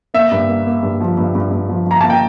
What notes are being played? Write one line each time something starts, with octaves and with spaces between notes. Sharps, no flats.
A#3 E5
G2
A#3
A#3
G2
F3
G2
G2
G2
F3
F3
A#5
A#3 A5
G5